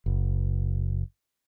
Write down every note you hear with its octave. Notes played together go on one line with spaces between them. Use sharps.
F#1